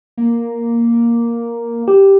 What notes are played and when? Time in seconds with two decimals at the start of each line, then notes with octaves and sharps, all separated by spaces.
0.17 A#3
1.88 G4